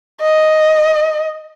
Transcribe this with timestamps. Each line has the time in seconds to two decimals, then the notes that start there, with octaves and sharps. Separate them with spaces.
0.21 D#5